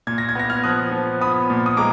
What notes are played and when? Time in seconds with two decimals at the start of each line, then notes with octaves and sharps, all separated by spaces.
0.07 A#2 G#6
0.18 A#6
0.29 G#6
0.35 B3 A#6
0.50 F6 G#6
0.64 F3 D#6 F#6
0.92 F3
1.20 B3 B5 D#6
1.50 A#2
1.66 D#6
1.77 G#3 A#5 D6